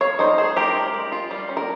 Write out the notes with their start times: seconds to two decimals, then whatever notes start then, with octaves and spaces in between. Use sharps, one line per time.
0.01 C4 C#5 F5
0.19 D#4 C5 D#5
0.38 G#3 G#4 C5
0.56 D#4 G4 A#4
0.75 G#3
0.94 G#3
1.12 F4
1.31 G3
1.49 C#4
1.57 A#4